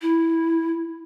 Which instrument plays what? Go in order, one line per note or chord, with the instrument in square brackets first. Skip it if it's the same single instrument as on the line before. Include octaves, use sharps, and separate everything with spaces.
[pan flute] E4